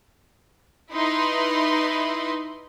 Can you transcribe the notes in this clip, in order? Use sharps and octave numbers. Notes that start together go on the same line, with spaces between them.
D#4 E4 B4 C6